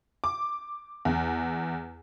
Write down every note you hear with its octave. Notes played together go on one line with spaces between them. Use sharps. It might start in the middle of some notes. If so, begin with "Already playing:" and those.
D6
E2